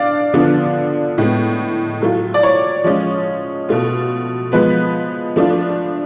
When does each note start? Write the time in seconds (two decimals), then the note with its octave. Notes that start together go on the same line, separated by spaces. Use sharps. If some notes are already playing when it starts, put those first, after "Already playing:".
Already playing: D4 D5 F5
0.34 D3 F3 B3 D4 F4
1.18 A2 G#3 B3
2.02 F#3 A3 F4
2.34 D5
2.43 C#5
2.84 F3 G#3 C#4 F4
3.69 B2 A3 F4
4.52 F3 G#3 B3 B4
5.36 F3 A3 D4 F4